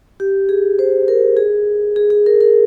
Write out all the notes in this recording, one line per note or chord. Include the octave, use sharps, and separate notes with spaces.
G4
G#4
C5
A#4
G#4
G#4
G#4
A#4
A#4